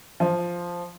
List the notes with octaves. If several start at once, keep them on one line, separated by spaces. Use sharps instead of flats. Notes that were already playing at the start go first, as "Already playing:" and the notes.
F3